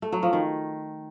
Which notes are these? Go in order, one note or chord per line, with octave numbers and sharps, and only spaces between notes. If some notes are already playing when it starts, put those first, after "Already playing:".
A3
F#3
F3
D#3